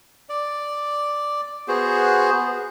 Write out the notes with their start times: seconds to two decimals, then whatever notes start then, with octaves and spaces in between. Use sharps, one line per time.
0.29 D5
1.68 B3 F#4 G#4 C5